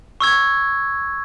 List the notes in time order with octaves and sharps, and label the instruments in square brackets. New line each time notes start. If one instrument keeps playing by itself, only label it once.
[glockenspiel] C#6 E6 G#6